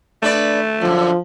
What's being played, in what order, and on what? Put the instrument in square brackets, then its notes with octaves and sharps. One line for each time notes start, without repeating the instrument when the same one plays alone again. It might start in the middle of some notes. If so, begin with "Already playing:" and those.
[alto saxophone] A3 [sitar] D4 B4 D5
[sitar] F#2 D3 [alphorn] F3